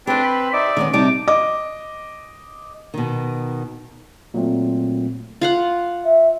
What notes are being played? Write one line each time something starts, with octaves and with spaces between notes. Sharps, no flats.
C4 D4 G4 B4 C5
B5
D#4 D5 E5
D#3 B3 C#4
C3 G3 D#4 A5 D6
D#5 D6
B2 D#3
A#2 F#3 A3 C4
F4 F5 F#5
E5